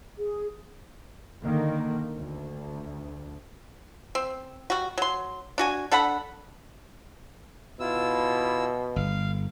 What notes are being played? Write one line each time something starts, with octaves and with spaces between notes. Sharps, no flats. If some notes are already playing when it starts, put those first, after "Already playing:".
G#4
D3 D#3 A#3
D2
C4
G3 F#4
F#3 C6
D4 F#4 G#5
D4 A4 F#5 B5
B2 E4 F4 E6
G1 F5